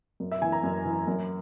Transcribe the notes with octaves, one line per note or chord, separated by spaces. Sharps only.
F#2
E5
E3 G#5
A#5
F#2
E3
F#2